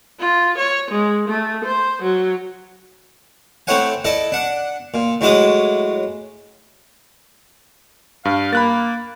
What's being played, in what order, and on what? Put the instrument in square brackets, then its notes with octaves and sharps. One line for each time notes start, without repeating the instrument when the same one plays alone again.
[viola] F4
C#5
G#3
A3
C5
F#3
[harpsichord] A3 C4 E4 C#5 F#5 G#5
E4 A4 D5 D#5
D4 F#5
A#2
A2 F#3 G#3 E4 D6 D#6
[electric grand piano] G2 [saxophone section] F5
[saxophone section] A#3 [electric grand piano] B5 F#6 A6